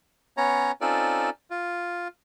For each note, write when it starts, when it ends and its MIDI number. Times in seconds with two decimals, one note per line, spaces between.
0.37 0.72 59
0.37 0.72 61
0.37 0.72 73
0.37 0.72 82
0.81 1.30 60
0.81 1.30 61
0.81 1.30 63
0.81 1.30 65
0.81 1.30 69
0.81 1.30 74
1.50 2.08 65